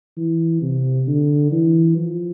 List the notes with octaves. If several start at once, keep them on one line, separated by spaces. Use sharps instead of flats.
E3
C3
D3
E3
F3